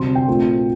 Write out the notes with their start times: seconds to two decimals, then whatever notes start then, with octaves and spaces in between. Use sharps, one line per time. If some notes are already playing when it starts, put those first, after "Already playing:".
Already playing: D2 C3 G3 C4 C6
0.15 G5
0.28 A#1 A#2 A3 C4